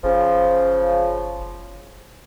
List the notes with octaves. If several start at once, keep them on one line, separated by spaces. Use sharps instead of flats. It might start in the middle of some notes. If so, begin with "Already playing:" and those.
F#1 C#3 F3